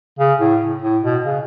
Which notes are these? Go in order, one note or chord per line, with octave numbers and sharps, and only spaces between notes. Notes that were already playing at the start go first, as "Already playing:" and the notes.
C#3
A2
A2
B2
C#3